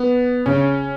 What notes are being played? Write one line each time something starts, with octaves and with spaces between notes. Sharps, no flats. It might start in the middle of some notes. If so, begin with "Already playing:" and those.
Already playing: B3
C#3 C#4